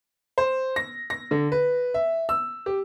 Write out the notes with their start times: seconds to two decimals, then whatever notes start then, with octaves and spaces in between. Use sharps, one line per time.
0.38 C5
0.76 A#6
1.10 A#6
1.31 D3
1.52 B4
1.94 E5
2.29 E6
2.66 G4